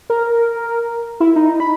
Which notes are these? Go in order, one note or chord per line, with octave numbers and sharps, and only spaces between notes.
A#4
E4
D#4
B5